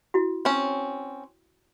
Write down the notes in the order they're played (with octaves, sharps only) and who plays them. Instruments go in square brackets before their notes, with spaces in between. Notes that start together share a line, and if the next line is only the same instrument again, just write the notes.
[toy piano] E4 F#4
[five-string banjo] C4 C#4